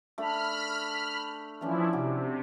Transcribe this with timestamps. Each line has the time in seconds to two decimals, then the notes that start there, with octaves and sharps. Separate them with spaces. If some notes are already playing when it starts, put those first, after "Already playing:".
0.18 A3 D4 A5 B5 F6
1.61 E3 F3 A3 C#4 D4 E4
1.93 C3 F#4 D6